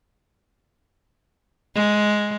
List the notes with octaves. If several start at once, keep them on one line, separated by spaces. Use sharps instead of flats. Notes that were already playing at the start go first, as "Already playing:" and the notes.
G#3